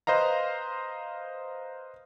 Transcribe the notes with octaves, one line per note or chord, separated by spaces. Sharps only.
B4 C5 D#5 F5 A#5